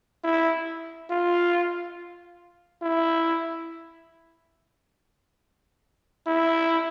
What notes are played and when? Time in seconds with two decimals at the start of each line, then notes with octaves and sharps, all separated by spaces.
0.24 E4
1.11 F4
2.82 E4
6.27 E4